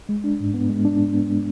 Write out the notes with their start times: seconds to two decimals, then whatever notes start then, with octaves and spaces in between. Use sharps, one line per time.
0.09 G#3
0.24 D4
0.40 G#2
0.54 B3
0.69 G#3
0.85 D4
1.00 G#2
1.14 B3
1.30 G#3